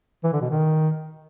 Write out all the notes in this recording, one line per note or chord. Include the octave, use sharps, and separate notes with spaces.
E3
D3
B2
D#3